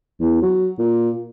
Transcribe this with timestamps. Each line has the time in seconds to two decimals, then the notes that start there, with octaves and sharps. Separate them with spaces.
0.20 E2
0.42 F#3
0.79 A#2